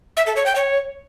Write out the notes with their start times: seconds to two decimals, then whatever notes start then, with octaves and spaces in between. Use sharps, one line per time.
0.17 E5
0.26 A4
0.36 C#5
0.46 G5
0.56 C#5